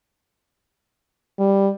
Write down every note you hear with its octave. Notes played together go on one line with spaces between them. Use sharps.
G3